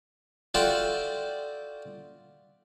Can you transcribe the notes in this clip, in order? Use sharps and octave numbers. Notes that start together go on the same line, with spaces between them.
F4 F#4 A4 D5 E5 G5